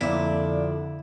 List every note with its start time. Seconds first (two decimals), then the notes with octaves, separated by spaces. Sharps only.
0.01 F2 A#2 D3 D4 E4